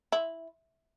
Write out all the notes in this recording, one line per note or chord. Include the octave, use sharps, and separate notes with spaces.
E4